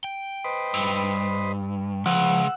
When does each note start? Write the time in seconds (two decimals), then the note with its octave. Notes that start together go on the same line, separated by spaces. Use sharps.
0.04 G5
0.44 B4 C5 D#5
0.74 G2
2.06 C#2 F3 F#5 E6